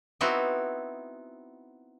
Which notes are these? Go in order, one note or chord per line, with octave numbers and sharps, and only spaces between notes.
B3 C4 D#4 E4 F#4